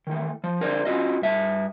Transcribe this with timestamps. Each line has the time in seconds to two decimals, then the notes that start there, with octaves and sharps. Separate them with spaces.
0.07 D#3 E3 A3
0.44 F3
0.61 D3 A#4 C5 D5
0.85 C#4 F4 F#4 D#5
1.22 G2 E5 A5